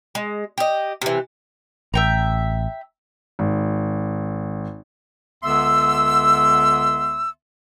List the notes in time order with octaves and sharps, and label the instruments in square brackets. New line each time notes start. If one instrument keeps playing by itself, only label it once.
[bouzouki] G#3
G4 D#5
C3 E3
[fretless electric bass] A1 [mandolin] E5 G5 A#5
[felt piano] G#1
[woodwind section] C#2 D3 B3 E5 C6 E6